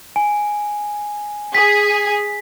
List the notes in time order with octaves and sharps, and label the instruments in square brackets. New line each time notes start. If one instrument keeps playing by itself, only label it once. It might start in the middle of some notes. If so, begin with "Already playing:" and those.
[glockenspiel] G#5
[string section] G#4 [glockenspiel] B6